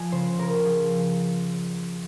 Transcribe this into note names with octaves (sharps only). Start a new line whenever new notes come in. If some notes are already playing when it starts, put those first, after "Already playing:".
Already playing: F3 G#5
C#3 C5
C#3 A#4
F3 G#4